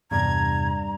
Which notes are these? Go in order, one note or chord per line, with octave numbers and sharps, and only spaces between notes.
E2 G2 C3 A#5 G#6